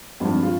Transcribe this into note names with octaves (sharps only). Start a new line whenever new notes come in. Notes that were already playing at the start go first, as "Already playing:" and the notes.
G#1 G2 F3 F4
F4